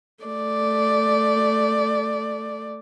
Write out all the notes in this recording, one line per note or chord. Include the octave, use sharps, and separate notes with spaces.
A3 D5